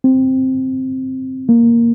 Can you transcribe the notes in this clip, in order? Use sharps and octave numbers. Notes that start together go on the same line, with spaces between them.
C4
A#3